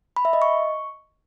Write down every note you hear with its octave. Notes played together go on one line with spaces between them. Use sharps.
B5
E5
D#5
C#6